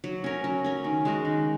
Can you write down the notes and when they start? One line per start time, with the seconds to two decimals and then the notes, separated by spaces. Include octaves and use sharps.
0.04 F#3
0.24 C#4 A#4
0.44 F#3
0.64 C#4 A#4
0.84 D#3
1.05 G#3 F#4 A#4
1.25 D#3